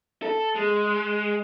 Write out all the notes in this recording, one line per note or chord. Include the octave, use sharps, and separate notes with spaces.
A4
G#3